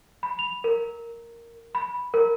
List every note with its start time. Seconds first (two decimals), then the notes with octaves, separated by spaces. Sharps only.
0.23 B5
0.39 F7
0.64 A#4
1.75 B5
2.14 A#4